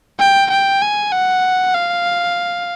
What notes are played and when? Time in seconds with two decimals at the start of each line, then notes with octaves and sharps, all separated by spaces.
0.19 G5
0.50 G5
0.82 G#5
1.12 F#5
1.74 F5